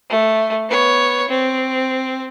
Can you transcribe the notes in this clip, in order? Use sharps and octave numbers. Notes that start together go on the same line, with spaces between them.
A3
B3 C#5
C4